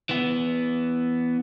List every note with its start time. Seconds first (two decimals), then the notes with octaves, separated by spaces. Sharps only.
0.09 E3 B3